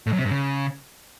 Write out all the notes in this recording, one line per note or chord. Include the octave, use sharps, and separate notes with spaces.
A2
F#2
C3
G2
C#3